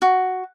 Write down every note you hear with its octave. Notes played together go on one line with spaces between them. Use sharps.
F#4